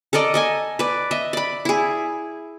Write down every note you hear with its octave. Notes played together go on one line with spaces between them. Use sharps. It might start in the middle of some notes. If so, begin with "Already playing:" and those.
A4 A#4 D5 D#5
A4 D#5 G#5
B4 D5
D#5 E5
D5 B5
E4 G#4